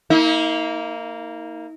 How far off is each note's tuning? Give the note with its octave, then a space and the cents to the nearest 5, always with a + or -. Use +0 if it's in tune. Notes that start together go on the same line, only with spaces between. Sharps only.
A#3 -15 D#4 +45